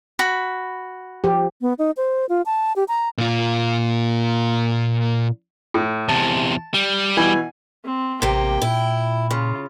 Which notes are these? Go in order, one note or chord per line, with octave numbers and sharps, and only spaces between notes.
F#4 B5
F3 G4
B3
D#4
C5
F4
A5
G4
A#5
A#2 F4
A2
E2 C3 A5
G3
B2 E3 G#5
C4
A1 C3 A#3 G5
A#2 E4
C#3 F4